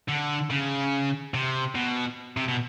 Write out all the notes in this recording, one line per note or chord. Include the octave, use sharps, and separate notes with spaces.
D3
C#3
C3
B2
C3
B2